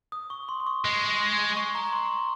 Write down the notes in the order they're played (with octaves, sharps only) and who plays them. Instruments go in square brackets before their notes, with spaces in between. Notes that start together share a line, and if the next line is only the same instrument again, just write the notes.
[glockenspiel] D#6
C#6
C6
C6
C#6
[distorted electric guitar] G#3
[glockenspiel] C#6
A#5
A#5
C6
C#6